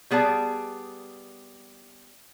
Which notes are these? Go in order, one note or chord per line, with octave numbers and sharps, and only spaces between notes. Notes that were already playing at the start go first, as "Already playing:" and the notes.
G3 B3 G#4 D5 A5